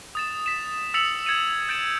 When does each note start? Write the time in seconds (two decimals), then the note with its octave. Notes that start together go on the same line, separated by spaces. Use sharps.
0.15 D#6 A6 E7
0.46 B6 E7
0.94 E6 A6 B6 C#7 F7 F#7
1.26 G#6 A6 C#7 D#7
1.69 G6 A6 D7 E7